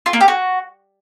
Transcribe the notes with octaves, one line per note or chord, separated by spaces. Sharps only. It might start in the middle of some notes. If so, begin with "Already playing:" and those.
F4
A#3
G4
F#4